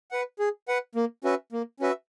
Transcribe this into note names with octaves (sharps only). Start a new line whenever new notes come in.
B4 F#5
G#4
B4 F#5
A#3
C#4 F#4 B4 E5
A#3
C#4 F#4 B4 E5